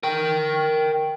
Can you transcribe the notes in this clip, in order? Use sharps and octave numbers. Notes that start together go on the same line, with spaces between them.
A#4 G5